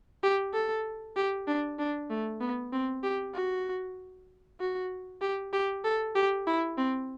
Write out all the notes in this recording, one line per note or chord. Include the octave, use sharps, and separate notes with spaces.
G4
A4
G4
D4
D4
A3
B3
C4
G4
F#4
F#4
G4
G4
A4
G4
E4
C4